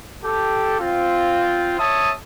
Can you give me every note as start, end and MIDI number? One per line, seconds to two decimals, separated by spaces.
0.24 0.75 67
0.24 0.75 69
0.80 1.78 60
0.80 1.78 65
1.79 2.12 73
1.79 2.12 76
1.79 2.12 81
1.79 2.12 87